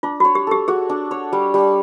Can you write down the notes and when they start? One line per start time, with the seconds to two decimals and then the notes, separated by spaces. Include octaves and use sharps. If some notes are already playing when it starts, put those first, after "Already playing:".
0.03 D4 F4
0.20 F#4 C#5
0.35 G4
0.47 G4 A4
0.68 F#4 G#4
0.89 D4
1.11 C#5
1.33 G3
1.54 G3